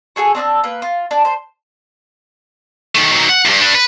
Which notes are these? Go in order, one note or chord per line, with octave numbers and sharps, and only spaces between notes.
F#4 G#4 A4 G#5
C4 D4 D#6 E6
A#3 B4
F4
D4
C5
D#3 A3
D#3 F#3
F#5
E2 G2
D4 B4
B4